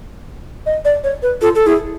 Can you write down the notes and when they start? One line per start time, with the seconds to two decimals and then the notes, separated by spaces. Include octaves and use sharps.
0.66 D#5
0.85 D5
1.04 C#5
1.23 B4
1.42 F4 A4
1.55 A4
1.66 E4 G#4